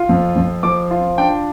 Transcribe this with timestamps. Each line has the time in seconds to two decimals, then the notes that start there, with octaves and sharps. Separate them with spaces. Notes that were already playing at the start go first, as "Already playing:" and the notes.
Already playing: F4
0.09 F2
0.36 F2
0.63 F3 D6
0.91 F4
1.18 D4 G5